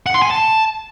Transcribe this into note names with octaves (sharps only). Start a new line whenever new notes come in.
F#5
C6
G#5
A5